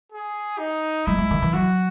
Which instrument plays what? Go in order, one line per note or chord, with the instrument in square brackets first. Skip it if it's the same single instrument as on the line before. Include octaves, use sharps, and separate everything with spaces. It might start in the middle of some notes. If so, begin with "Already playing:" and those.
[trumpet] G#4
D#4
[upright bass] G#3 [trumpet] E4
[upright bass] G#3
D#3
E3
[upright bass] F#3 [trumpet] F#4